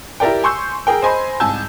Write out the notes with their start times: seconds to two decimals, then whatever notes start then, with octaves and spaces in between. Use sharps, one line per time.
0.20 E4 G4 A#4 D5 G5
0.44 G#5 C6 C#6 E6 G6
0.87 G#4 A#4 G5
1.02 C5 D#5 G#5 B5 C6
1.40 C2 G#2 G#5 A5 E6 G6